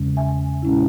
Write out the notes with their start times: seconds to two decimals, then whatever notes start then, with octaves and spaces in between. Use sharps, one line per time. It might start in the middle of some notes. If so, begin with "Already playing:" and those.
Already playing: E2 C#3 G#3 C#4
0.17 E5 G#5
0.62 A#2 G#3 C#4 E4